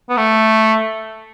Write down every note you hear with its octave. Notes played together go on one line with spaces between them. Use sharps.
B3
A3